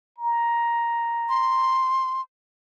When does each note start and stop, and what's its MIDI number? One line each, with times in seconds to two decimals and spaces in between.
0.18 1.91 82
1.29 2.21 84